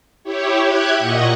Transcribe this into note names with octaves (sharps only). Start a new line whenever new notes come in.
E4 G4 C#5
G4 E5 F#6 G#6
A#2 D#5 F#5 C#6